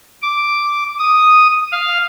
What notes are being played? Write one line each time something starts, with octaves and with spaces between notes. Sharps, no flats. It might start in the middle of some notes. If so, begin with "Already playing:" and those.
D6
D#6
F5